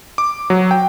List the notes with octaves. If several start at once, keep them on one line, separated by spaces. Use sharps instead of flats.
D6
F#3
G5